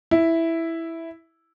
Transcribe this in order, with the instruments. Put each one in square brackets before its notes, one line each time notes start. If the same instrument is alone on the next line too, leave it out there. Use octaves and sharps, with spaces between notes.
[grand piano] E4